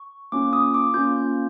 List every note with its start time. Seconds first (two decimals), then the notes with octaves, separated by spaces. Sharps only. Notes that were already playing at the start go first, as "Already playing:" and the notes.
Already playing: C#6
0.32 A#3 C#4 F4 D6
0.53 D#6
0.74 D6
0.94 A#3 C#4 F4 G6